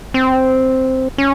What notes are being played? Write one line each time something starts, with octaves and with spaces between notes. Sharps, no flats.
C4
C#4